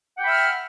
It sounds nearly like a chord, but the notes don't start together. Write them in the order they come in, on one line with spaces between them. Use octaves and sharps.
F#5 G5 B5 E5 F6